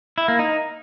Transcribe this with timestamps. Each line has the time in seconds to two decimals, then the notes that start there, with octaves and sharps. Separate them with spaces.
0.18 E4
0.28 A#3
0.39 D#4